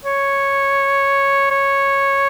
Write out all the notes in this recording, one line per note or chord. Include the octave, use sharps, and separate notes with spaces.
C#5
C#5